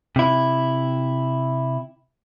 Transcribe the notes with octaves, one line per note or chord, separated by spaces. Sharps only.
C3 E4